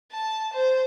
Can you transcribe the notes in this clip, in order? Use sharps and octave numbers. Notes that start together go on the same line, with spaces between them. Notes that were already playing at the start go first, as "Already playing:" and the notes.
A5
C5